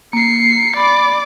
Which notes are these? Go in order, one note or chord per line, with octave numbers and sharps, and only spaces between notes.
A#3 C7 C#7
D5 B5 D6